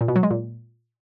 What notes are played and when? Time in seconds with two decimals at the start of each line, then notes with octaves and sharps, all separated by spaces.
0.01 A#2
0.08 B2
0.16 F#3
0.23 G#3
0.31 A#2